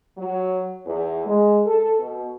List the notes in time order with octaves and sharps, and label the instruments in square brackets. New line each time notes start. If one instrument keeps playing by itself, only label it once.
[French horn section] F#3
E2
G#3
A4
B2